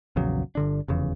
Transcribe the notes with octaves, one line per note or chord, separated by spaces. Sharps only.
A#1 E2 C#3 F#3
G1 D3 D4
F1 E2 C#3